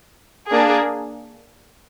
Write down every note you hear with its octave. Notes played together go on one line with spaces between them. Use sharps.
A#3 D4 G#4